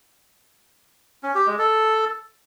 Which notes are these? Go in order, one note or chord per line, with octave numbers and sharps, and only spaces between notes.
C#4
G4
G#3
A4